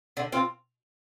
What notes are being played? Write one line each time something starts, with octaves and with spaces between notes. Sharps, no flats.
D3
C4 F4